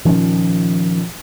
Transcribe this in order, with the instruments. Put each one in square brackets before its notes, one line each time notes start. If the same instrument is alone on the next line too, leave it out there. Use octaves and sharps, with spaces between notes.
[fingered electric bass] A#2 D#3 F3 C#4